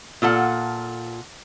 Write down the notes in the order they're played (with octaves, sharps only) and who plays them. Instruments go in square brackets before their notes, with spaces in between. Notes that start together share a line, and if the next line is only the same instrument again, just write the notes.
[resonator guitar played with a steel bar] A#2 F4 A4 F#5